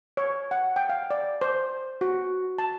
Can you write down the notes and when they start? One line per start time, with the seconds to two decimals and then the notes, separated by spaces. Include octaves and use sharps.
0.17 C#5
0.51 F#5
0.76 G5
0.89 F5
1.10 D5
1.41 C5
2.01 F#4
2.58 A5